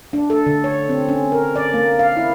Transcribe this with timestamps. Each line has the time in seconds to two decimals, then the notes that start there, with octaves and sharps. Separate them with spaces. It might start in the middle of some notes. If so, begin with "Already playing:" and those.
0.13 D4
0.30 A4
0.46 D3
0.64 C#5
0.89 C4
1.09 C#4
1.32 A#4
1.56 D5
1.74 A#3
1.99 F5
2.17 E4